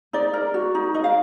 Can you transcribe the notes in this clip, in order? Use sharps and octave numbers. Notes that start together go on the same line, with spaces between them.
D#4 D5
A#4
F#4
D#4
D#4 D#5
F5